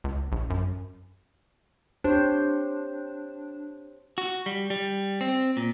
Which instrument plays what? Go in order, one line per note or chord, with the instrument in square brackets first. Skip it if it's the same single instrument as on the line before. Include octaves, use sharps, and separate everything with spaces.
[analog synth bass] C#2
A#1
F#2
[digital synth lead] D4 [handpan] G4 C5 C#5
[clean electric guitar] F#4
G3
G3
C4
A#2